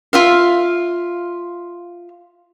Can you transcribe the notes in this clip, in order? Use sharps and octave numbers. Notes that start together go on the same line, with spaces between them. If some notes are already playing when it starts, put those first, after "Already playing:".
F4 E5 F5